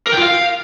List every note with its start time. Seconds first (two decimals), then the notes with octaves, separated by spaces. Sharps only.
0.07 A#4
0.12 G5
0.17 F4
0.22 F5